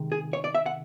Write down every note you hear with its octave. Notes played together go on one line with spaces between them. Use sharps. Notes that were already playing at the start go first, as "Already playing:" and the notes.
Already playing: C3 D#3 G#3
G#4
C#5
D5
E5
F#5